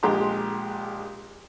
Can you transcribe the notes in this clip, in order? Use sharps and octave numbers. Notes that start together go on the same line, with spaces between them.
A#1 G#3 G4 A#5 C6